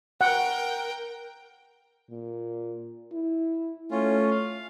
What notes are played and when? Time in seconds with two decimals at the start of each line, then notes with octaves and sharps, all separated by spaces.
0.21 A#4 F#5 G5
2.10 A#2
3.12 E4
3.91 A3 C#4 F4
4.31 F5